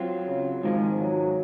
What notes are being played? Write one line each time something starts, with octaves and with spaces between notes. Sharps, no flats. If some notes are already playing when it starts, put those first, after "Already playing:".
Already playing: F#3 C4 F4
C#3
G#2 D#3 F3 G#3
F#3